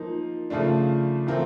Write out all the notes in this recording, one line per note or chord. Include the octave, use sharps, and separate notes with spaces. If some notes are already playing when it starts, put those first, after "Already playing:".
Already playing: F3 A#3 D#4
C#3 F3 A3 D4
E3 A3 C4 F4 A#4